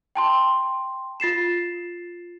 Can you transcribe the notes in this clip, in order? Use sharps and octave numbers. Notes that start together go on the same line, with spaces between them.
G5 A5 C6
F4 A6 C7 E7